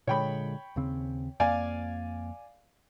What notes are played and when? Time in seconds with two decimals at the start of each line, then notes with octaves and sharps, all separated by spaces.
0.07 A#2 D3 G#3 C#5 G5 B5
0.76 D#2 C#3 C4
1.40 F2 A#3 D5 F5 G#5